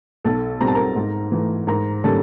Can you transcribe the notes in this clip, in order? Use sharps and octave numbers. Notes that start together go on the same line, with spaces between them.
B1 A4 A5
B2 G3 C4 A#5
A5
A#4 A#5
G#2
E3 A3
G#2 A#4 A#5
D#3 G3 A#3 C#4 A4 A5